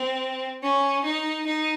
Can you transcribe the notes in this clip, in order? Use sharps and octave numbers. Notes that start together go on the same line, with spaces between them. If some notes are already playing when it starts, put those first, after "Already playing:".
Already playing: C4
C#4
D#4
D#4